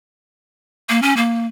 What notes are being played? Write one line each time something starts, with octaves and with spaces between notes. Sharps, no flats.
A#3
C#4
A#3